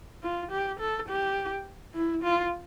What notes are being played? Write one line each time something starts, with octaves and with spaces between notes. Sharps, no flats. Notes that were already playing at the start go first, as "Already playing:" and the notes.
F4
G4
A4
G4
E4
F4